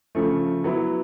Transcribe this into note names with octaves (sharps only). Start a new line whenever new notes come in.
C#3 F3 A3
F#3 B3 E4